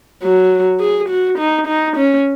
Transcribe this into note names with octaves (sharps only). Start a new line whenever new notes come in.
F#3
G#4
F#4
D#4
D#4
C#4